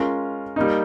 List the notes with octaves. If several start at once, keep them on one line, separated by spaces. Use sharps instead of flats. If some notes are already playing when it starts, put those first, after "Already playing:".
Already playing: G#3 C#4 F4 A#4
G3 A#3 D#4